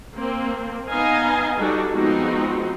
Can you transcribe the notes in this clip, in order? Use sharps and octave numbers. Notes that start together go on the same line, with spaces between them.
A#3 C4
B3 D#4 D#5 F5 G#5 A#5
G3 D4 D#4 F#4 A4
F3 G#3 B3 C4 D#4 F#4